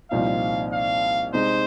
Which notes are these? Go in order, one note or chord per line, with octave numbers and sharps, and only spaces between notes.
C2 A#2 F3 C4 D#4 F5
F5
C3 G#3 D#4 C5